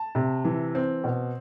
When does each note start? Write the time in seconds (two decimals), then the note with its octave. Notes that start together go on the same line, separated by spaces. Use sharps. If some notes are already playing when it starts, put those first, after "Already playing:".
Already playing: A5
0.15 C3
0.45 E3
0.75 C4
1.04 B2